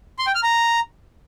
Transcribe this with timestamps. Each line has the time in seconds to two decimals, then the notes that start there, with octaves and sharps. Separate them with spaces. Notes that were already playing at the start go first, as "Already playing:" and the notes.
0.19 C6
0.27 G5
0.35 F6
0.43 A#5